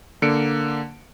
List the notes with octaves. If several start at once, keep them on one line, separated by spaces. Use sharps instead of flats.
D3 A#3 C#7 D7